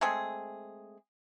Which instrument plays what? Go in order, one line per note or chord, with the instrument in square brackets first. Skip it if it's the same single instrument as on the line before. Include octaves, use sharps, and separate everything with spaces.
[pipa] G#3 A3 C4 G#4